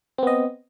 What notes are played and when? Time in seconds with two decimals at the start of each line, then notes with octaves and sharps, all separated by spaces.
0.18 C4
0.23 B3
0.27 D#5